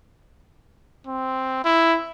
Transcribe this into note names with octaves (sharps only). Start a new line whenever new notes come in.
C4
E4